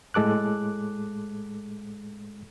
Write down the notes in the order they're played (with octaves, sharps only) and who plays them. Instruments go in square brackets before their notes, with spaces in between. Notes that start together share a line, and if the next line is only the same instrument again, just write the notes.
[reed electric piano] A2 G#3 A4 D6 F#6